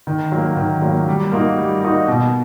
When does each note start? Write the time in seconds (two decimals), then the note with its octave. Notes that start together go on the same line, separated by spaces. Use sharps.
0.07 D#3
0.32 F#3 A#3
0.57 D#3
0.82 F#3 A#3
1.08 G3
1.32 A#3 D#4 F#4
1.58 G3
1.83 A#3 D#4 F#4
2.08 B2